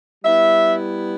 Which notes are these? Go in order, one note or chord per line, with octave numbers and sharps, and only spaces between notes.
G3 B3 E4 E5